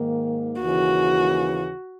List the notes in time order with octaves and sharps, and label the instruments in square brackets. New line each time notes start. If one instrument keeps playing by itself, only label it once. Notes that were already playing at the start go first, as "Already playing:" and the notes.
Already playing: [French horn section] G#2 D#3 A#3
[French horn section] D#2 C#3 E3 [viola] F#4